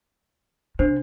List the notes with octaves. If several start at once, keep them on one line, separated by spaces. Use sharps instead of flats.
C3 D4 C5